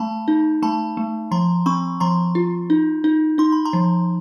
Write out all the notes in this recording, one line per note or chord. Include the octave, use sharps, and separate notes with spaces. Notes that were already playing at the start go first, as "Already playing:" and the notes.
Already playing: A3 A5 B5
D#4
A3 A5 B5
A3
F3 A#5 C6
C4 B5 C#6
F3 A#5 C6
F4
D#4
D#4
D#4 C6
B5
A#5 C6
F3